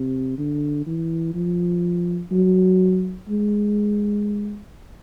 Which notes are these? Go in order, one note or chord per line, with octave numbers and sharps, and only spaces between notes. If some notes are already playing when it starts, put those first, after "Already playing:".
Already playing: C3
D3
E3
F3
F#3
G#3